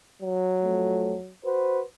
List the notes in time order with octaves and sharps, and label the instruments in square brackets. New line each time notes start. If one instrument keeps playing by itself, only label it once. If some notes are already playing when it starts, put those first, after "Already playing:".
[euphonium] F#3
[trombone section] F2 A3
F#4 B4 C5